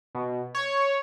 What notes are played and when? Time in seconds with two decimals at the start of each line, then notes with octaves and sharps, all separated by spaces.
0.15 B2
0.55 C#5